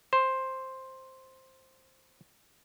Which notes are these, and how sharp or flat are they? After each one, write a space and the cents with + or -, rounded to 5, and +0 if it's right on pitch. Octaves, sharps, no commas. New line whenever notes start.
C5 +5